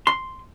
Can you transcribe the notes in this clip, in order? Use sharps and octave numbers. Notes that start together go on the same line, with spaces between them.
C6